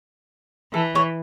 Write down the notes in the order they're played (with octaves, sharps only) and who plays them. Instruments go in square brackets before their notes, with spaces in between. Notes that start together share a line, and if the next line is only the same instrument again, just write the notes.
[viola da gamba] E3 [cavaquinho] A4
[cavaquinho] C#5